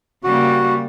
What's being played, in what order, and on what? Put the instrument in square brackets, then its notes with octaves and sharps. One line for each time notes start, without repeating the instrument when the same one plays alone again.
[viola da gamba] C#3 G3 A#3 [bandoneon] F#4